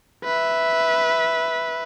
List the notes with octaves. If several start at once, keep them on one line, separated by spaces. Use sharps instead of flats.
B4 E5